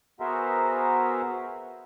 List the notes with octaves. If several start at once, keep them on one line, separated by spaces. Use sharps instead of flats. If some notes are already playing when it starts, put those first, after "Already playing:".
B3 F#4 G#4 A#4 C5 E5